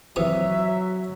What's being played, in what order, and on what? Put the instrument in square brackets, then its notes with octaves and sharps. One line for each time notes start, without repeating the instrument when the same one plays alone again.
[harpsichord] C3 E3 D#6 [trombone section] F#3 [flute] E5